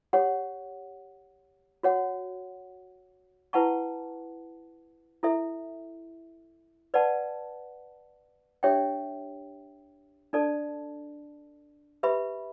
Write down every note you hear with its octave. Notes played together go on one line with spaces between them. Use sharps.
G4 C#5 F#5
F#4 C#5 F#5
E4 B4 F#5 A5 C#6
E4 A4 E5
B4 D5 F#5 A5
D4 G4 C#5 E5 G5
D4 A4 D5 A5
G4 B4 E5 B5